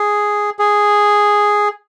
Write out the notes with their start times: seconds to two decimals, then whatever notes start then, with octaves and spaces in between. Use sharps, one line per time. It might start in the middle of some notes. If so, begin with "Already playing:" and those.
Already playing: G#4
0.59 G#4